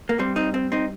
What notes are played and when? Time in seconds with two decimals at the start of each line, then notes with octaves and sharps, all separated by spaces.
0.09 A#3
0.18 G2 G3 C4
0.36 C4 D#4
0.54 C4
0.72 C4 D#4